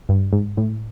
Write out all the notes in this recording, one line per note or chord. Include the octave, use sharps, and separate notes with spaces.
G2
G#2
A2